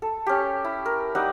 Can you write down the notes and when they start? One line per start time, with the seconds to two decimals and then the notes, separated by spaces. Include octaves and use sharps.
0.02 A4
0.26 C#4 G4
0.65 E4
0.86 A#4
1.15 G3 D#4 E4 F#5